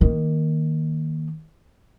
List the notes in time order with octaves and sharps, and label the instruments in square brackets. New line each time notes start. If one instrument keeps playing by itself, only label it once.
[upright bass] D#3 A#3